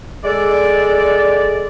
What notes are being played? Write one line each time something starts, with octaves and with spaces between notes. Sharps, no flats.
G#3 A4 D5